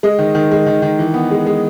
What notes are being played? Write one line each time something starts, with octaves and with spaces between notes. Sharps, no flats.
G#3 D#5
D#3
D#3
G#3
D#3
D#3
E3
B3
G#3
G#3